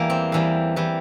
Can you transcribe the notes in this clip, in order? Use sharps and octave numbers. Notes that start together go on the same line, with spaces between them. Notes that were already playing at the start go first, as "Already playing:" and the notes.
Already playing: E2 E3 G3 A#3
C4
E2 E3 G3
E3 G3